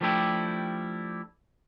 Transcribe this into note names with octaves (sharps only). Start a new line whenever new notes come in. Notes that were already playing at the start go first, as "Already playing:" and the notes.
F3 G3 A3 D4 E4 G4